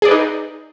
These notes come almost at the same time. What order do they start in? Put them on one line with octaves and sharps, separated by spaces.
G#4 D5 B4 D#4